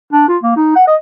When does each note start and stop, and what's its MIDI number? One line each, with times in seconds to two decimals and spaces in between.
0.13 0.26 62
0.28 0.37 65
0.43 0.52 58
0.56 0.74 63
0.76 0.85 78
0.87 0.95 75